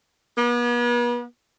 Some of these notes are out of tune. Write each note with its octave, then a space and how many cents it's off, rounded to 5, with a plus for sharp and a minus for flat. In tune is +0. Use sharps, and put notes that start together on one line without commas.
B3 -40